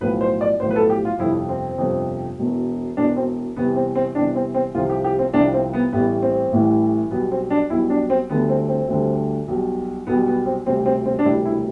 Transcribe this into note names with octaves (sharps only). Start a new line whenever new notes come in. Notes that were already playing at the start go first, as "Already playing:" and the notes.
B1 A2 F3 B4
C5
D5
B1 A2 F3 C5
B4
A4
G4
F4
G1 F2 C3 F3 E4
C4
G1 F2 C3 F3
E1 E2 B2
E1 E2 B2 D4
C4
E2 C3 E3 G3 B3
C4
C4
E2 C3 E3 G3 D4
C4
C4
C2 C3 F3 F4
G4
G4
C4
C2 C3 F3 D4
C4
B3
A1 A2 E3 G3 B3
C4
A1 A2 E3 G3
B1 B2 G3 B3
C4
D4
B1 B2 G3 E4
D4
C4
D2 D3 G3 B3
C4
C4
D2 D3 G3
B1 B2 G3
B1 B2 G3 B3
B3
C4
E1 D2 C3 G3 C4
C4
C4
D4
E1 D2 C3 G3 E4
E4